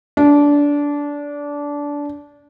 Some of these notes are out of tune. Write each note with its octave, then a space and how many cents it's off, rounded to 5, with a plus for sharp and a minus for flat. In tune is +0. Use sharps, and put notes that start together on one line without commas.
D4 -20